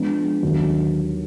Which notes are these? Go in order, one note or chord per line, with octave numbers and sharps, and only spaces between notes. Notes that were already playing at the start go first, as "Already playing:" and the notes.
Already playing: F3 G#3 B3 D4
D#2 D3 F#3